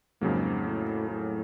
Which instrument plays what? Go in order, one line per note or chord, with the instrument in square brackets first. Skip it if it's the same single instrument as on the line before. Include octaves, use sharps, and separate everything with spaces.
[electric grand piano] F2 C#3 F#3 A#3 [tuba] G#2
[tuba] A2
A2